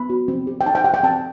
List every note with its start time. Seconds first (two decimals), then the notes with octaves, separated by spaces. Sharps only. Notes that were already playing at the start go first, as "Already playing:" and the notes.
Already playing: B3 B5
0.10 F#4
0.28 C4
0.47 G4
0.61 G5
0.66 D#4 A5
0.75 G5
0.84 G4 F#5
0.94 G5
1.03 C4 A5